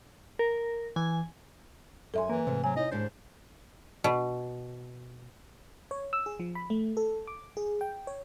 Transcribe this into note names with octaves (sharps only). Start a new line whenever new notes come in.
A#4
E3 G#5
F#2 A4 E5 G#5 C6
E3 A#3
D2 G#2 C3
F#3 G#5
D#4 E4 C#5 D#5
D#2 G#2 D4 C5
B2
C#5
E6
G#4
F3
B5
A3
A4
D6
G#4
G5
C#5